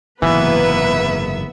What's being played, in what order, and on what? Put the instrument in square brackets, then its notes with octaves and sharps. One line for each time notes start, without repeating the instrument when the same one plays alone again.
[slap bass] F#1 G#2 C3 [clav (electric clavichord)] E3 [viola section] A#3 B4 [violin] B3 E5